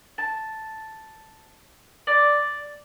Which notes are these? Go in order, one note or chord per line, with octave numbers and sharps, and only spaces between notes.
A5
D5